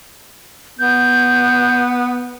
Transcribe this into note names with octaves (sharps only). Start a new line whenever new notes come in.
B3 G6